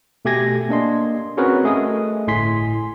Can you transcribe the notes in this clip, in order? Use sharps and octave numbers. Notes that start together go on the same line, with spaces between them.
B2 A3 G4 G#5 G#6 A#6
A#3 D4 D#5 C6
C4 C#4 F#4 G#4 A#4 B4
A3 G#4 D#5 D#6
G1 A2 G#5 C6 B6